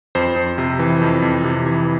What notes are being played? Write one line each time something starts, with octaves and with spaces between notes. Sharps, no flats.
F2 C5
F2
C3
E3
F2
F2
C3
E3